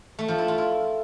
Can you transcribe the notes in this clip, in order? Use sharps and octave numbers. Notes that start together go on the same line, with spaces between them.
A3
F3
E4
F4
E4